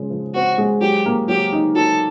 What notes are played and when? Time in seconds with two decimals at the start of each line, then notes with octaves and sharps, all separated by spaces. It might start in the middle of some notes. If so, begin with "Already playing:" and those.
Already playing: C#3 F3 G#3
0.10 F3
0.34 C4 F#4
0.58 G#3
0.81 F#3 G4
1.06 A#3
1.28 F#3 G4
1.52 D#4
1.75 F#3 A4